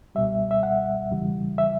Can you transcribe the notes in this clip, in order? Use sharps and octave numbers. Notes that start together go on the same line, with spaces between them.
C#2 B2 G3 E5
E5
F#5
E2 C#3 E3 G3
E5